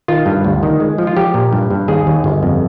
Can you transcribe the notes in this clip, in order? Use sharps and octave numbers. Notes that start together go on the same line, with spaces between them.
D#3 F4
G2
D2
D#3
G#3
F3
F4
F3 G4
A#2
G2
G2
D#2 G#4
D#2
G1
F2